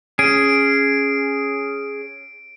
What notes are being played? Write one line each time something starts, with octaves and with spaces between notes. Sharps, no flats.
C#4 G#4 D7